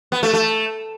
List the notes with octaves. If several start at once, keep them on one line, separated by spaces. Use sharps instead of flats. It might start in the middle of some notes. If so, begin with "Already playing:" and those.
B3
A3
A3